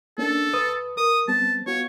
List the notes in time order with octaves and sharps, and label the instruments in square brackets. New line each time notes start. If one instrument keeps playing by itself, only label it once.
[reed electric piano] A#3 C#4 D4 [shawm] A4
[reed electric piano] C#2 B4 D#6
[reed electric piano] A#4 [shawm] D#6
[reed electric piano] G3 B3 C4 [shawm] A5
[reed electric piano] B3 F4 F#4 [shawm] C#5